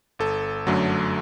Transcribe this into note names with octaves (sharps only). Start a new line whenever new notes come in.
G1 A4
F#2 D3 F#3 A3